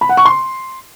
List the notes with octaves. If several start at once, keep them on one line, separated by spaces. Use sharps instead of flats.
B5
F#5
C#6
C6